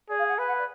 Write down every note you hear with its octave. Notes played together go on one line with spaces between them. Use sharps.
G#4 D5
F5
F#5
B4 G#5
F#5
D5